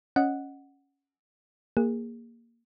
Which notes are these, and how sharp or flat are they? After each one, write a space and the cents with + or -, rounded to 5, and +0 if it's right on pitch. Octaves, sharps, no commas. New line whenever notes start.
C#4 +0 D#5 +0 F#5 +0
A#3 +0 G#4 -25